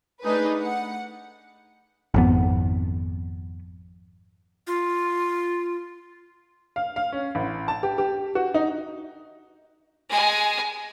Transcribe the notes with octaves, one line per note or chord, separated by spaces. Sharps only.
A3 D4 D#4 G#4 B4
F#5
G#1 F2 B3
F4
F5
F5
C#4
A1
A5
G4
G4
F#4
D#4
G#3 G#5